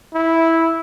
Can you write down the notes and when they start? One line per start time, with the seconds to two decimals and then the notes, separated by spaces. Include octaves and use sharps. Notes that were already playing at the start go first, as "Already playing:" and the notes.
0.14 E4